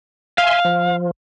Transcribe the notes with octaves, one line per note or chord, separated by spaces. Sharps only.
E5 F5 G#5 C6
F3